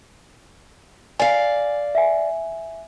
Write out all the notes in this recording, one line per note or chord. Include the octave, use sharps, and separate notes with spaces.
D5 F5 G#5
E5 G#5